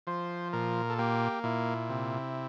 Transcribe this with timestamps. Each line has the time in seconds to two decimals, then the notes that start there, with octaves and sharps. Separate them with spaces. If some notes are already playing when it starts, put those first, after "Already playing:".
0.07 F3 C5
0.53 A#2 A#4
0.90 A4
0.98 A#3 G4
1.43 A#2 E4
1.89 C3